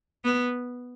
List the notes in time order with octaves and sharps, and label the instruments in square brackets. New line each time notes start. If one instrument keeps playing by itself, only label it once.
[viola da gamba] B3